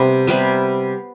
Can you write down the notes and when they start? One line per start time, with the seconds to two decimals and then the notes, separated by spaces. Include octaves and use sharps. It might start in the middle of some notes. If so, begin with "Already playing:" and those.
Already playing: C3 G3 B3
0.27 C3 G3 B3